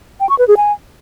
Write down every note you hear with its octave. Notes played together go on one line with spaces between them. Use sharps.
G5
C#6
B4
G#4
G#5